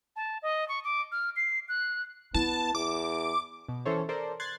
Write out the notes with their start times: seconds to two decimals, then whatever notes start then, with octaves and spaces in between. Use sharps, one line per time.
0.16 A5
0.42 D#5
0.68 C#6
0.84 D6
1.12 F6
1.36 C7
1.69 F#6
2.34 B3 E4 A5
2.75 E2 D6
3.68 B2
3.85 E3 C#4 A4 C5 C#5
4.09 A4 A#4 C5 D5
4.40 C6 F#6 G#6 A6 C7